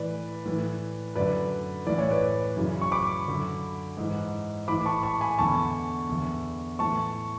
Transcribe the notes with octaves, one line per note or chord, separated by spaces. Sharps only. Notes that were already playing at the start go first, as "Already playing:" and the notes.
Already playing: A2 E3 B4 D5
A2 E3
F#2 D3 B4 D5
A2 E3 D5
C#5
B4 D5
F#2 C#3 E3
C#6
B5 D6
F#2 D3
G#2 E3
A2 E3 B5 D6
A5 C#6
A5 C#6
G#5 B5
E2 D3 A5 C#6
E2 D3
A2 E3 A5 C#6